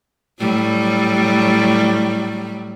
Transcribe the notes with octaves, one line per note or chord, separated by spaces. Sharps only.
A2 F#3 G3